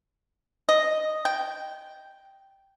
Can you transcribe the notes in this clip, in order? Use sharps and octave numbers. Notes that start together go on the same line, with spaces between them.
D#5
G5